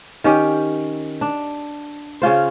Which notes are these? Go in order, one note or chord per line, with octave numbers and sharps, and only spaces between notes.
D#3 C#4 G4
D4
C#3 C#4 F4 C5